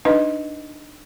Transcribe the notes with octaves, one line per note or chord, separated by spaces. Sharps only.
D4 D#4 B4 D#5